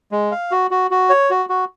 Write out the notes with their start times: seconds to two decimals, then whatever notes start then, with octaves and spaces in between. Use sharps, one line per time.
0.12 G#3
0.31 F5
0.51 F#4
0.71 F#4
0.91 F#4
1.10 C#5
1.30 F#4
1.49 F#4